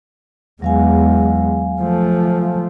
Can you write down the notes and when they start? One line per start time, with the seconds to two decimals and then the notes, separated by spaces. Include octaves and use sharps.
0.62 E2 F#3 G#3 F5 G#5
1.82 F3 A3